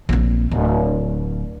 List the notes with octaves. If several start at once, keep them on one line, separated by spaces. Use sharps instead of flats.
A#1 C4
D1